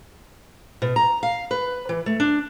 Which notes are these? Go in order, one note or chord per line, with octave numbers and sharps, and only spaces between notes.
B2
A#5
F5
B4
E3
A3
D4